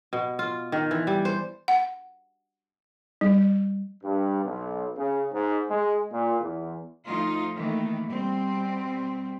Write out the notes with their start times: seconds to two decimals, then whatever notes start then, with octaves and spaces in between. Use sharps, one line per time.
0.13 B2
0.39 F4
0.72 D#3
0.91 E3
1.07 G3
1.25 C5
1.68 F#5
3.21 G3
4.04 G2
4.43 B1
4.96 C#3
5.32 G#2
5.69 G#3
6.11 A#2
6.41 E2
7.06 D2 F3 D#4 F4
7.55 D#3 E3 A3 A#3
8.08 B2 G3 C4